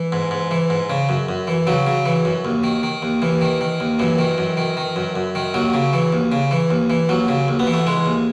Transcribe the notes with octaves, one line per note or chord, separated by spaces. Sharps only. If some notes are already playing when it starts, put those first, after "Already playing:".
Already playing: E3
G#2
G#2
E3
G#2
C#3
F#2
F#2
E3
C#3 F#3
C#3
E3
F#2
D#2
D#3
D#3
D#2
D#2 E3
D#3
D#3
D#2
F#2 E3
D#3
F#2
D#3
D#3
F#2
F#2
D#3
D#2 F#3
C#3
E3
D#2
C#3
E3
D#2
E3
D#2 F#3
C#3
D#2
B3
E3
A3
E3 G#3
D#2